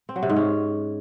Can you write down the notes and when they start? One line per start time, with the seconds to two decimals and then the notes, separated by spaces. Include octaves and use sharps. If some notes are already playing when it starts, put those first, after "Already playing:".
0.09 C4
0.16 F#3
0.23 C3
0.29 G#2
0.36 C#4